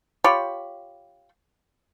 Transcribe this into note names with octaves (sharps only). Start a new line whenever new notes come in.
F4 G4 C#5 B5